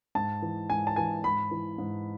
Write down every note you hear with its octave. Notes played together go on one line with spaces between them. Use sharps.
G#2 A5
E3
G#2 G#5
A5
E3 G#5
G#2 B5
E3
G#2